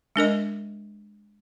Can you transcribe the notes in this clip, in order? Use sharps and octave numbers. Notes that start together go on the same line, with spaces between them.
G#3 D4 A#4 D#5